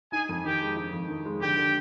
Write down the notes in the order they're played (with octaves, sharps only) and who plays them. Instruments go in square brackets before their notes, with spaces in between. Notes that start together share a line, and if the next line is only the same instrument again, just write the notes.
[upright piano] D#4 [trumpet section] G#4 G#5
[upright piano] F2
[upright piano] D#3 [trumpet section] G4 G5
[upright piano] G#3
D#4
F2
D#3
G#3
[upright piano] D3 [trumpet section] G4 G5
[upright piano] D3